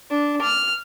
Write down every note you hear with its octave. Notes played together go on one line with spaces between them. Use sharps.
D4
F6